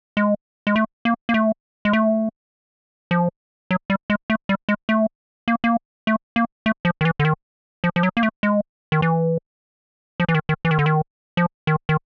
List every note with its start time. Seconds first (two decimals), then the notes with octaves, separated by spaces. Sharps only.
0.17 G#3
0.67 G#3
0.76 A3
1.05 A#3
1.29 A#3
1.34 A3
1.85 G#3
1.93 A3
3.11 F3
3.71 F#3
3.90 G3
4.10 G#3
4.30 A3
4.49 G3
4.69 G#3
4.89 A3
5.48 A#3
5.64 A#3
6.07 A3
6.36 A#3
6.66 A3
6.85 F3
7.01 D#3
7.05 E3
7.20 D3
7.25 D#3
7.84 F3
7.96 F3
8.03 F#3
8.17 A#3
8.23 A3
8.43 G#3
8.92 D#3
9.02 E3
10.20 F3
10.29 E3
10.35 D#3
10.49 D#3
10.65 E3
10.71 D#3
10.79 D3
10.86 D#3
11.37 F3
11.67 D#3
11.89 D#3